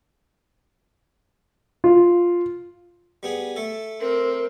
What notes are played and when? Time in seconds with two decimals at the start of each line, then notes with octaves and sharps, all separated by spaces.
1.84 F4
3.23 G3 B3 G#4
3.56 A3 A4
4.01 C4 A#4